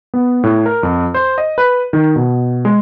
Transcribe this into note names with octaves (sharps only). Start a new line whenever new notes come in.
B3
A2
A#4
F2
C5
D#5
B4
D#3
B2
G#3